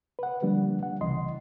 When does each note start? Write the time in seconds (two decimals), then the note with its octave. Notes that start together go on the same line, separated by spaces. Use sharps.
0.19 B4 F#5
0.42 D3 F3 G3 A#3 D4
0.83 F#5
1.01 C2 C#3 E3 D#5 C6